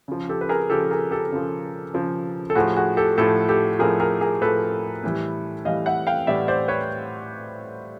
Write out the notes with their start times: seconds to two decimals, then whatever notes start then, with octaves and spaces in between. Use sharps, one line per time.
0.08 C#3 F3
0.29 G4 A4
0.41 B4
0.49 G#4 A#4
0.70 C#3 F3 G4 A4
0.91 G#4 A#4
1.11 G4 A4
1.32 C#3 F3
1.94 C#3 F3
2.50 A4
2.55 A2 F3 F#4 G#4
2.76 F#4 G#4
2.97 G4 A4
3.17 A2 F3 G4 A4
3.48 G4 A4
3.79 A2 F3 G#4 A#4
4.00 G#4 A#4
4.21 G#4 A#4
4.41 A2 F3 A4 B4
5.04 A2 E3 G3
5.65 A2 E3 G3 D#5 F5
5.86 E5 F#5
6.07 F5 G5
6.27 A2 E3 G3 D5 E5
6.48 C5 D5
6.68 B4 C#5